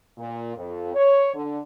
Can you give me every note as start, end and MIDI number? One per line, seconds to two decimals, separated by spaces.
0.18 0.56 46
0.56 0.94 41
0.94 1.33 73
1.35 1.59 50